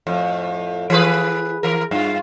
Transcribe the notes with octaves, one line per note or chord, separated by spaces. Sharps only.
F2 A2
E3 G#4 B4
E3 A#4
G2 F4